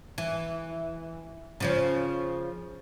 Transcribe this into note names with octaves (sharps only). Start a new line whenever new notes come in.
E3
C#3 F3 C#4